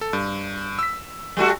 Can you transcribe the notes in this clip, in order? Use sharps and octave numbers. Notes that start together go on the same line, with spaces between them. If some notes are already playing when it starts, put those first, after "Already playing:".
A4
G2
E6 B6
G3 A3 F#4